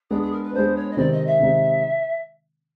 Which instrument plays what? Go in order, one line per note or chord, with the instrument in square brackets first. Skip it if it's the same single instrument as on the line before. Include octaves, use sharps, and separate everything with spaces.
[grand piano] G#3 B3 D4 [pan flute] G#4
[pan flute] G#4
A#4
B4
[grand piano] G#3 B3 D4 [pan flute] C5
[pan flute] C#5
D#5
[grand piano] C3 D#3 G#3 C4 D#4 [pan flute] D5
[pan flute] D#5
E5
[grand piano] C3 D#3 G#3 C4 D#4